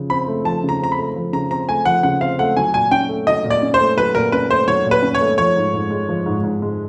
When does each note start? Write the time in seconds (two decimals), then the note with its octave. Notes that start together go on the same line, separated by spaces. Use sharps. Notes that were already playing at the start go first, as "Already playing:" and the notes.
Already playing: C#3 F3
0.10 C4 B5
0.28 A3
0.44 F3 A5
0.63 C#3
0.69 A#5
0.81 C4 A#5
0.92 B5
0.98 A3
1.16 F3
1.33 C#3 A#5
1.51 C4 A#5
1.68 A3 G#5
1.85 F3 F#5
2.03 C#3 F#5
2.21 C4 F5
2.39 A3 F#5
2.57 F#3 G#5
2.74 A#2 G#5
2.91 C#4 G5
3.09 A3
3.26 F#3 D#5
3.44 A#2
3.50 D5
3.62 C#4
3.74 C5
3.79 A3
3.97 F#3 B4
4.15 A#2 A#4
4.32 C#4 B4
4.50 A3 C5
4.68 F#3 C#5
4.85 A#2
4.91 B4
5.02 C#4
5.15 C#5
5.21 A3
5.38 F3 C#5
5.56 G#2
5.74 G#2
5.90 G#3
6.09 F3
6.26 G#2
6.43 G#2
6.62 G#3